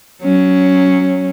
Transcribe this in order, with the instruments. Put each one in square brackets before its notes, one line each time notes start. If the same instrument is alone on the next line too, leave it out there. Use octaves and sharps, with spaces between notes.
[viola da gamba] F#3 C#4